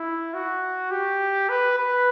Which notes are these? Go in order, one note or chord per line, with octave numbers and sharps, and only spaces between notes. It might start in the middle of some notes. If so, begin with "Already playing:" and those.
Already playing: E4
F#4
G4
B4
B4